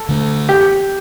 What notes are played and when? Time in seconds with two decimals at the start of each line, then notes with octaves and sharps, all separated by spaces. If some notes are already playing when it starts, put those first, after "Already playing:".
Already playing: A4
0.09 D3 A3
0.49 G4